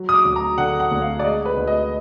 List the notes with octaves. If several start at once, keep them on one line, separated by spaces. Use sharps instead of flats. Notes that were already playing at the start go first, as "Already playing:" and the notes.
Already playing: F#3
D#6
D6
D2
A#5
D3 F#5
F#5
D2
F5
D5
G#3 D#5
B4
D2
D#5